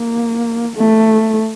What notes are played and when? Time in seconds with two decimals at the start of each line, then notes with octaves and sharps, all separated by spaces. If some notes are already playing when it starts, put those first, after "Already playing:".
Already playing: A#3
0.76 A3